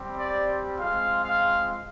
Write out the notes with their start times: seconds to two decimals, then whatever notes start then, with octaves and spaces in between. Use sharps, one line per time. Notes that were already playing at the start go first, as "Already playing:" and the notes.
Already playing: G3 C4 G4
0.17 D5
0.77 G#3 C4 F4 F5
1.23 F5